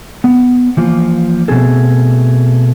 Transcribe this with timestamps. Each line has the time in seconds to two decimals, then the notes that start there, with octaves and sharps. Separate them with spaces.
0.24 B3
0.77 E3 F3 A#3
1.48 B2 F#3 A3 C4 G#4 A4